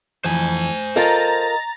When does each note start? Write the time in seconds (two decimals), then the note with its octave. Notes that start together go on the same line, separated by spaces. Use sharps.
0.24 F2 E3 C5 G#5
0.96 F4 A4 A#4 D#5 A#5 A6